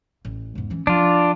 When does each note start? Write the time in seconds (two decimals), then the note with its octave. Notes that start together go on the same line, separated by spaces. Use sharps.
0.25 A1
0.55 E2 G#2
0.70 E3 C#4
0.87 F3 D4 F4